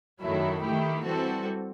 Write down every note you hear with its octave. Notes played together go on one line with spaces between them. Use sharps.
F#2 D#3 F#3 A3 E4
D#3 A3 E4 G4
E3 G3 C4 F#4 A4